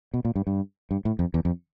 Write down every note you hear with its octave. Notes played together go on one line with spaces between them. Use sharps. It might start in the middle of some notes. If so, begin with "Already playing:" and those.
B2
A#2
G2
G2
G2
A2
F2
E2
F2